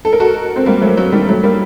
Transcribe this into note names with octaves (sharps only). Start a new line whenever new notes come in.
A4
A#4
F#4 A4
C4
G3 A#3
F#3 A3
F#3
D#3 G3
F#3 A3
G3 A#3